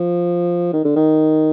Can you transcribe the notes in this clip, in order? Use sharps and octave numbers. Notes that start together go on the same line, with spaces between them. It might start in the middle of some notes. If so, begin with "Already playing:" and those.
Already playing: F3
D#3
D3
D#3